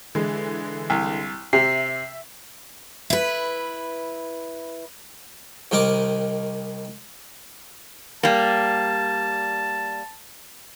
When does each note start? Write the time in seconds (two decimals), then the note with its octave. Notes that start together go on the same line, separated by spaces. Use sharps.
0.15 D3 E3 G#3
0.90 C2
1.53 C3 E5 C7
3.10 E4 B4
5.72 C2 D#3 D#4 A#4 D#5 D6
8.23 G3 A#3 A5